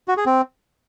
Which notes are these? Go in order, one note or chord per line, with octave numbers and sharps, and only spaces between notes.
F#4
G#4
C4